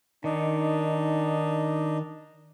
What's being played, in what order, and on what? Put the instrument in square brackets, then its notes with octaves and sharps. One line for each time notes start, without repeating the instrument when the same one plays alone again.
[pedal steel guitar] D#3 [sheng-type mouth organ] D4 D#4